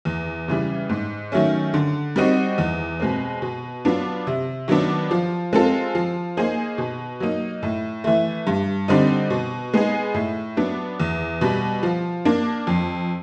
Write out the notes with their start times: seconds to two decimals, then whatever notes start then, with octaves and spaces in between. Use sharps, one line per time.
0.05 E2
0.48 C#3 E3 G3
0.89 G#2
1.32 D#3 F#3 A3 C#4
1.74 D3
2.16 G3 C4 D#4 F#4
2.58 E2
3.00 B2 G#3 C4
3.42 B2
3.85 F#3 B3 D4 F4
4.27 C3
4.68 D#3 F#3 B3 D4
5.11 F3
5.53 G#3 C4 F4 A4
5.95 F3
6.37 A#3 D#4 G#4 C5
6.78 B2
7.20 F#3 A#3 D#4
7.63 A2
8.04 E3 A3
8.47 G2
8.88 D3 G3 C4 D#4
9.30 B2
9.74 G#3 B3 D#4 G#4
10.14 A2
10.57 F#3 B3 D4
11.00 E2
11.41 B2 G3
11.83 F3
12.25 A#3 D4
12.67 F2